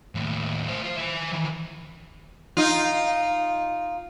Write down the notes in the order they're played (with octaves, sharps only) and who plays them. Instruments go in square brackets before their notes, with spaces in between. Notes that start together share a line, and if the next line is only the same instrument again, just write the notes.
[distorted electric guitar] D#2 A2
E4 C5
F4 C5
E4 G#5
D#3 E3
[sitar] D#4 F4